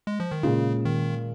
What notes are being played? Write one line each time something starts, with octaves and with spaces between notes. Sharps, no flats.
G#3
F3
D#3
A#2 C#3 G#3 C#4 F4
D#3